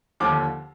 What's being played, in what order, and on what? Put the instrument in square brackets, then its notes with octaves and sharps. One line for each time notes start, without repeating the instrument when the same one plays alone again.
[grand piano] D#2 D3 F3 D6